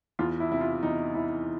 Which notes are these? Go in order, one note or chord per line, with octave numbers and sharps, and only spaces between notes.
E2 F4
E4
C3 E4
F4
E2 D#4
E3 E4